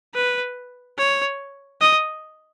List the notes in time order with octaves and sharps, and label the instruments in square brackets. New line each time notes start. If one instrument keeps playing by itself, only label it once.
[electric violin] B4
C#5
D#5